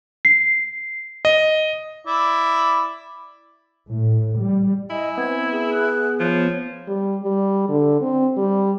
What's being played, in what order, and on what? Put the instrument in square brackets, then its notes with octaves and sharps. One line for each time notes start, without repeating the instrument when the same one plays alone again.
[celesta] C7
[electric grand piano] D#5
[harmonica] E4 D5
[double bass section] A2
G3
[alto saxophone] E4 [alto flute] D#5 [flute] G#5
[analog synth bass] B3 [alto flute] C4 [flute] G#6
[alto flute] G#4
[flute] F#6
[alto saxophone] F3 [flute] C#5
[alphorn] G3
G3
D3
C4
G3